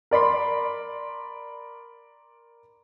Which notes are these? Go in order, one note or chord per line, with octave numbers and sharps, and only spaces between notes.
A#4 D5 B5 C6